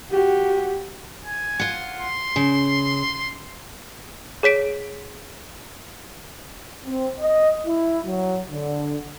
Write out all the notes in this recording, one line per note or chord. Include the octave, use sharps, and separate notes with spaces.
F#4 G4
G#5
F4 F#5
C6
C#3
G#4 C#5 B6 D7
C4
D#5
E4
F#3
D3